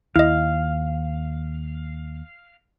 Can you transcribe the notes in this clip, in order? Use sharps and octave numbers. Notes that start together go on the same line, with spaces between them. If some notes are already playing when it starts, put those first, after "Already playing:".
D#2 E4 D#5 F5